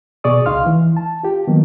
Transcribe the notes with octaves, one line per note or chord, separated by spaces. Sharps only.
B2 G#4 D5 C#6 D#6
C#2 D#4 F5 C6 F6
E3
A5
F4 G4
D#3 F#3 A#3 B3